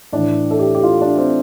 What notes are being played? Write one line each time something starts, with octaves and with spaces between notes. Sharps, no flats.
A2 E3 D4
A4
G4
G4
F4
D4
C4